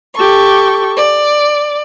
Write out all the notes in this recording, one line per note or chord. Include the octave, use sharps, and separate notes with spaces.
G4 A4 C#6
D5